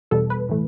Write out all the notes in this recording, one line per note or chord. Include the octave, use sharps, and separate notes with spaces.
E2 B2 G3 A4
B4
A2 E3 A3